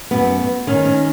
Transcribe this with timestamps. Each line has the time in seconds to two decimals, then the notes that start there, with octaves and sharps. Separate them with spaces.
0.11 F#2 B3
0.39 B3
0.67 D#3 C#4
0.85 C#4